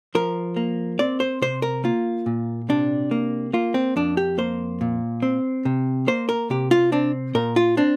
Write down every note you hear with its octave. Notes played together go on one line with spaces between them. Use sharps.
F3 A#4
A#3
C4 D5
C5
C3 C5
A#4
A#3 F4
A#2
C3 D4
A#3
A#3 F4
C4
F2 D4
G4
A#3 C5
A#2
C4
C3
A#3 C5
A#4
C3 G4
F4
C4 D4
A#2 A#4
F4
C4 D4